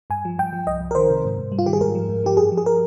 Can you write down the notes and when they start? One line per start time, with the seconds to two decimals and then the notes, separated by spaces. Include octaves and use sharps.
0.10 G2 G#5
0.25 F3
0.38 G2 G5
0.53 F3
0.67 C2 D#5
0.81 C2
0.91 A#4
0.95 D#3 C5
1.10 C3
1.24 G#2
1.38 G#2
1.52 G3
1.59 F4
1.66 D#3 G4
1.73 G#4
1.81 G#2 A#4
1.95 F3
2.09 G#2
2.24 F3 G4
2.37 G2 G#4
2.52 F3
2.57 G#4
2.66 A#4